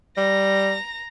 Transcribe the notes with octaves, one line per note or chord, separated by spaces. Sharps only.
G3 A#5 A#6